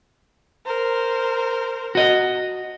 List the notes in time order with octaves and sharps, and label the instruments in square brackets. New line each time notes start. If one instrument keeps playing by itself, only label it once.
[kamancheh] A#4 C5
[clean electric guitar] F#4 D#5